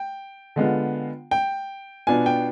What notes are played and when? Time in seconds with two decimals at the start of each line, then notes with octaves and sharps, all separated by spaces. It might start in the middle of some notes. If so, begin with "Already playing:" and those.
Already playing: G5
0.56 D3 G#3 B3 F4
1.31 G5
2.07 B2 B3 D4 F4 G#5
2.26 G5